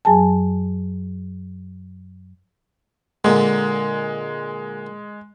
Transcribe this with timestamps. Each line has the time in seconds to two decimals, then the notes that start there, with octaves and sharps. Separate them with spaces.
0.05 F#2 F#3 G#4 G#5 A5
3.24 A#2 D3 G#3